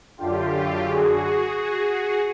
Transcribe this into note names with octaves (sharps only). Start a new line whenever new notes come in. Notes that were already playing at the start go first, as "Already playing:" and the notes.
F#2 D3 F4 G4
F#4 G#4
F#4 G#4